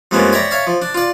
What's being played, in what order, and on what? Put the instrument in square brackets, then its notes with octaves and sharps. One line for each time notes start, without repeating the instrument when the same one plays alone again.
[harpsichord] F2 G3 G#3 A#3 B3 C#4
C#5 D5 E5 G5 A#5
C#5 E5 F5 A5
F3
D4
F4 D5